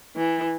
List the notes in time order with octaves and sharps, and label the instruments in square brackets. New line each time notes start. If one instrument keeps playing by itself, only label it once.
[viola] E3